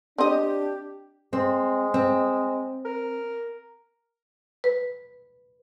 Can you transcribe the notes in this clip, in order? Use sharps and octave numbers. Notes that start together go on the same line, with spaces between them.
C4 D4 G4 D#5
G#3 C4
C4
A#4
B4